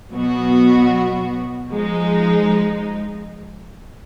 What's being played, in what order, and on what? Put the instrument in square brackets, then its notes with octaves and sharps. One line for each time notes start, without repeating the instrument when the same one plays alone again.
[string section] B2 F#3 B3 F#4
F3 G#3 D#4